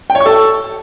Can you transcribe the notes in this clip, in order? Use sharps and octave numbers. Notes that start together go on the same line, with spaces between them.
G5
C#5
C#6
A4